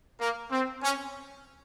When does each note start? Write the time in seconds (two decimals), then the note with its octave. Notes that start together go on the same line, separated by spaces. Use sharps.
0.20 A#3
0.51 C4
0.82 C#4